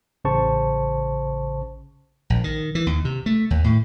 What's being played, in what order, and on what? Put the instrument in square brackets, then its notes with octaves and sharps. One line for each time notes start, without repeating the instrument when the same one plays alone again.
[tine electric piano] A1 C#3 C5 A5 C#6
[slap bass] A#1
D#3
E3
D#2
C3
A3
D#2
A2